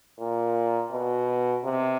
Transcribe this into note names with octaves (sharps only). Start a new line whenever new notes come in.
A#2
B2
C3